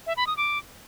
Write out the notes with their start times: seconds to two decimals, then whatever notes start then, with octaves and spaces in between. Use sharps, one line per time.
0.07 E5
0.17 B5
0.27 D#6
0.37 D6